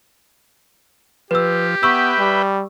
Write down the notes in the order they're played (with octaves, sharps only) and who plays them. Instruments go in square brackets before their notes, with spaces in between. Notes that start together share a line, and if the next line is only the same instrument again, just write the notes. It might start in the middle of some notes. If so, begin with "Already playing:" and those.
[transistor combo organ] F3 [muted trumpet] G4 [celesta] B4 E6
[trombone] B3 [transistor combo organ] B4 E5 G5 [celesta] C#6 E6
[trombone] G3